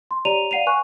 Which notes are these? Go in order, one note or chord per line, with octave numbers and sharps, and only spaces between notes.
C6
G4 C#5 D5 A#5 D#7 F7
D5 F5 F#5 C7 D#7 F7
B4 F#5 G#5 C#6 F#6